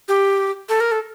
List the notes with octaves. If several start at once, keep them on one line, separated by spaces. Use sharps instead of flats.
G4
A4
A#4
A4